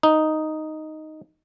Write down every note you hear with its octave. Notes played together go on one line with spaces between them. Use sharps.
D#4